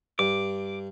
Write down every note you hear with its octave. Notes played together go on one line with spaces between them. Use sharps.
G2 D6